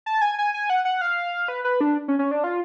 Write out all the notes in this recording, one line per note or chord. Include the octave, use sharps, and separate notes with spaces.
A5
G#5
G#5
G#5
F#5
F#5
F5
B4
B4
D4
C#4
C#4
D4
F4